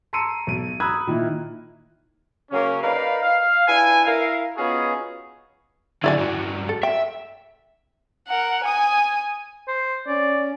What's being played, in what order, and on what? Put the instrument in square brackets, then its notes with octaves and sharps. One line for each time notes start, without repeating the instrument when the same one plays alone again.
[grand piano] A5 A#5 C6 E6 C#7 D#7
B1 D#7
A#5 B5 D#6 E6 F#6 G#6
A#2 D#3 A#3 E4
[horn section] C#3 F#3 A#3 C#4
D#4 A#4 B4 D5 F5
F5
D4 E4 B4 G#5
E4 A#4 F5
B3 C#4 D#4 F4 F#4 G#4
[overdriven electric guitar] D3 F#3 [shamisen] E4 D5 G#5
[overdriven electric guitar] G2 F#3
[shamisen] A4
[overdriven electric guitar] E5 [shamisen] G5
[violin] A#4 F#5
G#5 D#6
[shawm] C5
[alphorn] C#4 [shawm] D5